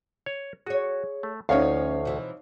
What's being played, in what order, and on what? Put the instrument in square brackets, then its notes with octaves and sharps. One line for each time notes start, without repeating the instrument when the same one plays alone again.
[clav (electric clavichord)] C#5
[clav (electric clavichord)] F#4 [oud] G#4 C#5
[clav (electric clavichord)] A3
[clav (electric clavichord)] D2 [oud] F3 C#4 [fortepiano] D#4 C#5 F5
[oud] B2 E3 C4